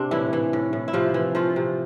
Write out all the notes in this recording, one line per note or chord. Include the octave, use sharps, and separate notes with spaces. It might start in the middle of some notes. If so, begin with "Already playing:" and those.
Already playing: C3 C4 D4
A2 E3 E4
E3
A2
A2
E4
C3 F3 F4
E3
F3 A3 F4
C3